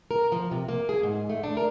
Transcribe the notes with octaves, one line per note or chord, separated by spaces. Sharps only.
A#4
F3
C3
A#3
G#4
G#2
A3
D4
A#4